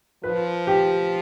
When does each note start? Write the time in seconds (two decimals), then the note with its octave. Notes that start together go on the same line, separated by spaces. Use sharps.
0.24 F3 B4
0.67 G4